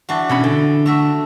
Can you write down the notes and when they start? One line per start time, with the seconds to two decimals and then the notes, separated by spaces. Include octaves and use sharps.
0.09 E3 D4 F#4
0.30 B2 C#4 B5
0.44 D3
0.86 A3 F#4 E5